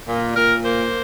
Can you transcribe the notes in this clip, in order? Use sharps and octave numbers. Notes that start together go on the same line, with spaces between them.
A#2
A#2 A#4
A#3 C5